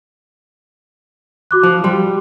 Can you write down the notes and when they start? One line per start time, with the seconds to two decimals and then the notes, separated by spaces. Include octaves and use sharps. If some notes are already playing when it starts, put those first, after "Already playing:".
1.51 F#4 D6 F#6
1.63 F3
1.84 G3 C6